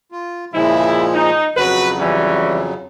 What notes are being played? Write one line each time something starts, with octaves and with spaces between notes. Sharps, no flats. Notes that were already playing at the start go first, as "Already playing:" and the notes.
F4
A#2 C#3 F3 G#3 E4
D#4
F2 C#3 F#3 F#4 B4
E3 G3 C#4